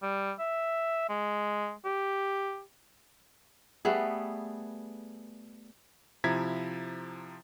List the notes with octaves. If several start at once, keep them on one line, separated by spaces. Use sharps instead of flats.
G3
E5
G#3
G4
G3 A3 B3 G#4
C3 F3 E4 A#5 G#6 B6